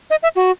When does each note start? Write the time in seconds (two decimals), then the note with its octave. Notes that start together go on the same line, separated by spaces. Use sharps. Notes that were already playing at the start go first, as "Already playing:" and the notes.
0.10 D#5
0.23 E5
0.35 F#4